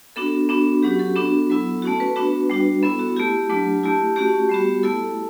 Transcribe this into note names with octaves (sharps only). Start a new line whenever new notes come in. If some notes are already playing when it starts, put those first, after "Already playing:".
B3 D4 F#4 A4
B3 D4 F#4
F#3 C#4 F#4 G4
A4
B3 D4 F#4
F#3 B3 E4
A3 C#4 F#4 A4
B4
B3 D4 F#4 B4
G3 D4 F#4
B3 E4 A4
F#4
A3 E4 G4
F#3 A3 D4
A3 E4 G4
A3 C#4 F#4 G4
G3 B3 F#4
A3 E4 A4